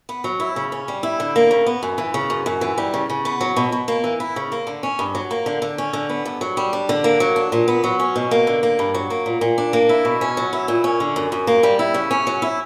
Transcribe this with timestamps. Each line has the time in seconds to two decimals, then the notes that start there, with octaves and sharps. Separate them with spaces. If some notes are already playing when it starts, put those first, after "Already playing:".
0.09 B3
0.24 F#3
0.40 E4
0.56 C#3
0.72 C#4
0.88 G3
1.03 E4
1.20 D3
1.36 A#3
1.51 C#3
1.67 B3
1.83 F#2
1.98 E3
2.14 C#3
2.30 F#2
2.46 F#2
2.61 E3
2.78 G3
2.94 C#3
3.10 C#3
3.25 B3
3.41 F#3
3.56 B2
3.72 B2
3.88 A#3
4.04 E3
4.20 E4
4.36 C#3
4.52 A#3
4.67 D3
4.83 C#4
4.99 G2
5.15 F#3
5.31 A#3
5.46 D3
5.62 D3
5.78 C#4
5.93 D3
6.09 B3
6.26 G2
6.41 F#3
6.57 G3
6.73 D4
6.89 D3
7.04 A#3
7.20 F#3
7.36 D4
7.52 A#2
7.68 B3
7.84 F#3
8.00 C#4
8.16 B2
8.31 A#3
8.47 D3
8.63 A#3
8.79 G2
8.94 F#3
9.10 A#3
9.26 A#2
9.41 A#2
9.58 D4
9.73 A#3
9.89 E4
10.05 B2
10.21 C#4
10.37 F#3
10.53 E4
10.68 A#2
10.84 C#4
11.00 D3
11.16 F#2
11.32 F#2
11.47 A#3
11.63 G3
11.79 E4
11.94 C#3
12.11 C#4
12.27 F#3
12.42 E4